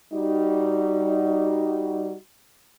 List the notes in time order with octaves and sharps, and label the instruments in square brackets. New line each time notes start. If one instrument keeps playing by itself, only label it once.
[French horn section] G3 D#4 F#4